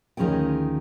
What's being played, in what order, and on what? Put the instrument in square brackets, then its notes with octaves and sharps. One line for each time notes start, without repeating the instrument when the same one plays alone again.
[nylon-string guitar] D2 D#3 F3 C#4 G#4 G5